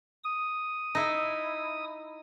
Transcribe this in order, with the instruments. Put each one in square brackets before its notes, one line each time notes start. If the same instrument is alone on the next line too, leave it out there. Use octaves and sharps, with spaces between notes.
[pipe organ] D#6
[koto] D#4 E4